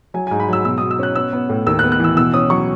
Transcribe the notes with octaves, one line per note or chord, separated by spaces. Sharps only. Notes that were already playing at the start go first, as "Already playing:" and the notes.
F#3 G#5
G#5
G#2
B5
F#3 E6
B2 E6
D#6
B2
E6
C#4 F#6
B3 E6
B3
A2
D#2 E6
F#6
B3
F#6
E3 E6
B2 E6
C#4 D#6
F#3 C#6